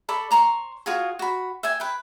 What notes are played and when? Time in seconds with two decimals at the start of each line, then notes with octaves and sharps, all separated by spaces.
0.09 A4 D5 B5 C#6
0.31 C5 A#5 C6 C#6
0.86 F4 F#4 G#4
1.19 F#4 B5
1.63 E5 G5 G#5
1.80 B4 G5